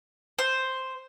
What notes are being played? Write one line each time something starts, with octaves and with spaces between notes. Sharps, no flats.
C5